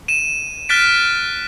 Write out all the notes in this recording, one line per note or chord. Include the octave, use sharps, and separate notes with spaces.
D#7 E7
F6 F#6 A6 B6 D7